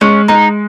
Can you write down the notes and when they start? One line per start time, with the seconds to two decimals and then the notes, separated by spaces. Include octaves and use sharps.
0.01 G#3 C#4
0.28 G#3 D#4